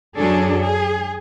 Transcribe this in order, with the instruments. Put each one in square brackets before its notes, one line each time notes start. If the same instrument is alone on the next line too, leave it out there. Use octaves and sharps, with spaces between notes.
[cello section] F#2 F#3 D4 G#4 A4
G#4